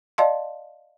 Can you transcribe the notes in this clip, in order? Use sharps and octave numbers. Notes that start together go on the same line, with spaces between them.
D5 D#5 F5 A5 C6